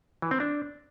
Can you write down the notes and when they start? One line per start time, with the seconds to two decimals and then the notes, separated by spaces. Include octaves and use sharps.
0.22 E3
0.31 C4
0.40 D4